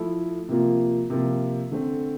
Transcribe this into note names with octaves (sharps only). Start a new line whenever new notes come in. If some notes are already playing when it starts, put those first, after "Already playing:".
Already playing: F3 A3 E4 A4
C3 F3 A#3 F4
C3 F3 A#3 F4
D3 A3 C4